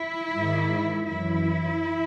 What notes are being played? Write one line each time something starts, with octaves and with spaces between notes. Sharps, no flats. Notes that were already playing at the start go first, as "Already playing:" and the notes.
Already playing: E4
G#2 D#3
F#2 E3 E4